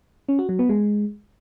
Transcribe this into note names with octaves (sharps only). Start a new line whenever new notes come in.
C#4
F#4
F#3
B3
G#3